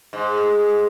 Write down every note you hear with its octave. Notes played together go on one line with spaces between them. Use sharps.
G#2